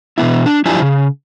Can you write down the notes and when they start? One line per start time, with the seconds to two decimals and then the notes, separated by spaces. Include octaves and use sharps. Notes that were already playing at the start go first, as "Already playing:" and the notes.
0.18 B2 E3 B3 E4
0.46 D4
0.65 F#2 F3 D4 E4 G4 G#5
0.82 C#3